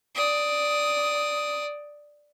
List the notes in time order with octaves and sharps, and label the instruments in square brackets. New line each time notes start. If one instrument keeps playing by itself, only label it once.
[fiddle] D5 D#6